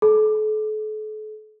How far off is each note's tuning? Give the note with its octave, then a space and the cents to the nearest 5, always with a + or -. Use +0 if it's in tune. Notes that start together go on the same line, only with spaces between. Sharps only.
A4 -40